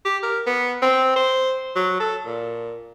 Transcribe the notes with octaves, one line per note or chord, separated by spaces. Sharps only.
G4
A#4
B3
C4
C5
F#3
A4
A#2